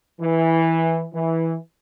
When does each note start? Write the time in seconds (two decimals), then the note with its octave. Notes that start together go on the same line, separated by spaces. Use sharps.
0.21 E3
1.14 E3